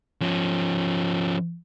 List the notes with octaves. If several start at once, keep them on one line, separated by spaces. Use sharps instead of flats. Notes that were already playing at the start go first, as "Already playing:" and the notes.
F3 C#4